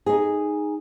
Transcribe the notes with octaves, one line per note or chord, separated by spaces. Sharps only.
D#4 G#4